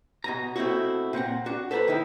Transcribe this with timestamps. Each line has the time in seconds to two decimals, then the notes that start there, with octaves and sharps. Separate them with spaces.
0.24 B2 G#5 A#5
0.56 B2 A3 C4 E4 F#4
1.13 A#2 C4 F#5 A#5
1.46 D4 F#4
1.71 A4 B4 C5 G#5 A#5 B5
1.88 D#3 D#4 E4